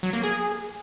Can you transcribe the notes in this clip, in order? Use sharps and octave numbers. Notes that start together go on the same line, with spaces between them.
F#3
A#3
G#4